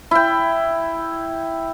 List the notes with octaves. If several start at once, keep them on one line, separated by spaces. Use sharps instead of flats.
E4 G5